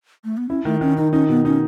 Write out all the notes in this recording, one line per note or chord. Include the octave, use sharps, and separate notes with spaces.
A3
B3
C#4 E4
D#3 A3
D#3 C#4
D#3 D#4
C#4 D#4
B2 B3
C#4 D#4